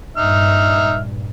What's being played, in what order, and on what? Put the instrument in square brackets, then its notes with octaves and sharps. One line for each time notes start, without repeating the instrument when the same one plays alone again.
[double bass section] G2 A#2 [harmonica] D#4 E5 F6